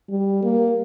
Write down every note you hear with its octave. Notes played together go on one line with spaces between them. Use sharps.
G3
A#3